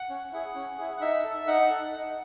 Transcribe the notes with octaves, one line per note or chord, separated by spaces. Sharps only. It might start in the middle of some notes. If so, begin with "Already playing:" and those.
Already playing: F#5
C#4
E4 G#4
C#4
E4 G#4
F#5
D#4 E5
A4
D#4 F#5
A4
D#4